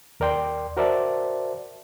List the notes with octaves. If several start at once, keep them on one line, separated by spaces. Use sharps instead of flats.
D#2 A#4 D5 G5 C6
F#4 A#4 C5 D5 E5 A5